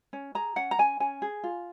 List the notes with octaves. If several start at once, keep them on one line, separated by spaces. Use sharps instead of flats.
C#4
G#4 A#5
C#4 F#5
A#5
C#4 G#5
C#4 G#5
G#4
F4